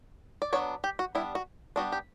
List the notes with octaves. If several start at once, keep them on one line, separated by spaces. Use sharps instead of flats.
D5
F#3 B3 D4 C#5
G4
F#4
G3 B3 D4 E4
F#4
G3 B3 D4 F#4
G4